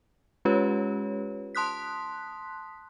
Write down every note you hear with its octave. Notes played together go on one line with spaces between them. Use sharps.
G#3 C#4 F4 G4 B4 C#5
A5 C6 D#6 F#6 B6